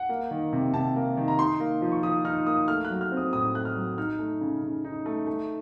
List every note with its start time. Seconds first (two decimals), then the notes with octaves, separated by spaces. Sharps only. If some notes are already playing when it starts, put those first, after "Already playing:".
Already playing: F#5
0.09 A#3
0.31 D#3
0.53 C3
0.74 C3 A5
0.96 A#3
1.17 D#3
1.28 A#5
1.39 D#4 C6
1.60 A#3
1.82 F3
1.92 C#6
2.03 F3 D#6
2.25 D#4 F6
2.47 A#3 D#6
2.68 A3 F6
2.85 F#6
2.90 F#3
3.01 F6
3.12 C4
3.17 D#6
3.33 A2 D#6
3.54 A3 F#6
3.65 F6
3.77 F#3
3.98 D#4 F6
4.19 A3
4.41 C#3
4.62 C#3
4.84 D#4
5.06 A3
5.27 A3